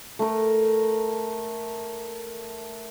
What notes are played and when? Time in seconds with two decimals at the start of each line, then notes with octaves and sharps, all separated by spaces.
0.19 A3 A#4